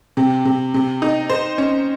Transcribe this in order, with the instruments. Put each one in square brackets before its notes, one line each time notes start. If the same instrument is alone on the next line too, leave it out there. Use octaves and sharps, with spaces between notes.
[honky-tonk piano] C3
C3
C3
D#4
C5
C#4